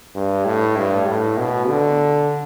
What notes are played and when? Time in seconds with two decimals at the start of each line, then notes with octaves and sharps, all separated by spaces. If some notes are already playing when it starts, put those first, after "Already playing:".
0.15 G2
0.45 A2
0.77 G2
1.08 A2
1.38 B2
1.68 D3